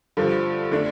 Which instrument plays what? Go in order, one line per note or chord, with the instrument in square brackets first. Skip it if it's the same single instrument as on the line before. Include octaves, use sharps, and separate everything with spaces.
[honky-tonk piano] G2 D3 F3
D3 A3 D4